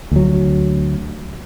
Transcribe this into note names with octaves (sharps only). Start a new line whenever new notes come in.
D2 F#3